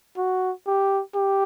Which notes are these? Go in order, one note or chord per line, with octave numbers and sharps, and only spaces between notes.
F#4
G4
G4